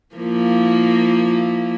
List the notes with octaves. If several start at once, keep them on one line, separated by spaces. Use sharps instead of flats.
F3 A#3 E4